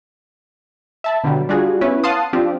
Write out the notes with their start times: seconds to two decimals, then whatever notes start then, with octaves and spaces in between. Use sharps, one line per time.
1.04 E5 A5 B5
1.24 B2 D3 F#3 G3
1.49 G3 D4 F4 F#4 G#4
1.81 B3 C#4 E4 B4 C#5
2.04 F5 F#5 A5 C6 D#6
2.33 F3 C4 D4 F4 G4